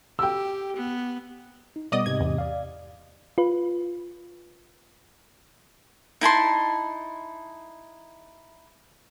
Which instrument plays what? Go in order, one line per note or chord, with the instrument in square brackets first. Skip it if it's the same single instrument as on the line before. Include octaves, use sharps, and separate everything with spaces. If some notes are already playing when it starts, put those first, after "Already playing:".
[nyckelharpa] G4 [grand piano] G5 E6
[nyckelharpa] B3
[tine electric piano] D#4
[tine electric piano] B2 G3 B3 [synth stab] D5 D#5 D#6
[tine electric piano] G#2 C3 D#5 [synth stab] G#6
[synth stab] E2
[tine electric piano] D5 F5
[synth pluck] F4 B4
[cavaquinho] D#4 E4 A5 C6